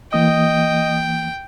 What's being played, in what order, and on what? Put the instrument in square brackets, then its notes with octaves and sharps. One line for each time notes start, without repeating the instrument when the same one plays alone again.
[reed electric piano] E3 A#3 D#6 [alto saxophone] D#5 [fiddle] G5